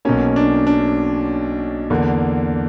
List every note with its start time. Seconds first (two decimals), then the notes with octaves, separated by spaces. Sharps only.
0.05 B1 B2 F#3 A#3 C#4
0.36 D4
0.67 D4
1.90 E2 D3 A#3